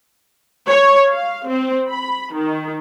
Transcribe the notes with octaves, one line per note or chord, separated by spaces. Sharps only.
C#5
F5
C4
B5
D#3